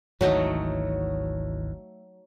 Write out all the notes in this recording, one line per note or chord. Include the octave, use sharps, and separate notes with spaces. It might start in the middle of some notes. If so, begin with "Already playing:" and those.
G#1 D2 E3 F#3 A3 D#4